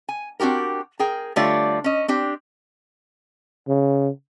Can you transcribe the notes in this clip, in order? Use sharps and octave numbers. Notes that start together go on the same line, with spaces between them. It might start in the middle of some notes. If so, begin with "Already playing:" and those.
G#5
C4 D4 F#4 G4 A#4
G#4 A#4 G5
D3 G3 A3 F4 C#5 D5
C#4 D#5
C4 D4 G4
C#3